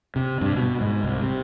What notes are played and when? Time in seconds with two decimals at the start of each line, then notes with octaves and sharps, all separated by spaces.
0.16 C3
0.41 G2
0.56 B2
0.81 G#2
1.03 C2
1.22 C3